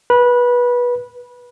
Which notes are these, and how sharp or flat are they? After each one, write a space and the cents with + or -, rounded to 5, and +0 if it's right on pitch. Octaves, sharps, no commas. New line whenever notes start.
B4 -20 B5 -20